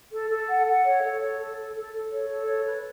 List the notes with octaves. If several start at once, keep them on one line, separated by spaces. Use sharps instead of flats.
A4
A4
F#5
F#5
C#5
A4
C#5
A4
A4
A4
A4
C#5
A4
C#5
B4